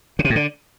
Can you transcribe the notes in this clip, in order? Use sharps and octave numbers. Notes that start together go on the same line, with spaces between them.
C#3
C3
A2
D3